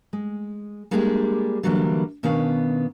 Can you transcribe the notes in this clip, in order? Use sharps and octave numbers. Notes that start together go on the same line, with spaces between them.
G#3
G3 G#3 A#3 D4 G4 G#4
D3 E3 F#3 G3 A#3 D4
B2 D#3 B3 C#4 D4 F5